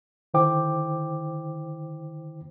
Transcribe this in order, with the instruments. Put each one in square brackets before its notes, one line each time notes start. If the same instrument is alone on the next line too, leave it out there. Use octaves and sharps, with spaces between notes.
[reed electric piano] D3 D#3 E4 C5 G5 D6